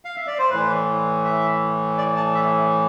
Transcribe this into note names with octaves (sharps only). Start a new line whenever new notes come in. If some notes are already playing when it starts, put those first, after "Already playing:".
F5
E5
D5
C5
A2 E3 B4
E5
D5
A5
E5